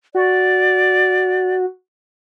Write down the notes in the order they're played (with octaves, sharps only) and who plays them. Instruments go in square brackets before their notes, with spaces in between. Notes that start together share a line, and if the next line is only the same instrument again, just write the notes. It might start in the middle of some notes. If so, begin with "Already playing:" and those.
[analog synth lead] F#4 [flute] D5